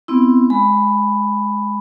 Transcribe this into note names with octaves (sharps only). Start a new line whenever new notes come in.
B3 C4 E4
G#3 B5